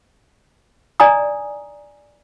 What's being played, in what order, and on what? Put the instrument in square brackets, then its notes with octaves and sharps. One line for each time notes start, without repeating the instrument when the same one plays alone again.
[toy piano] D5 D#5 G#5 A#5 D#6